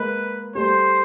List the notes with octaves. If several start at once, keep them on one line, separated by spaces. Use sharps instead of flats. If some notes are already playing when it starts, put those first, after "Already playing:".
Already playing: G#3 A#3 B4
G3 A3 C5